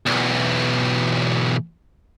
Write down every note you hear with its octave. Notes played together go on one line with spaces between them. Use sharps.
B1 E2